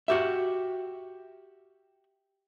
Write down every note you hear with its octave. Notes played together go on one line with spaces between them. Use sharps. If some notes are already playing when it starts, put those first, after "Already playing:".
F#4 G4 E5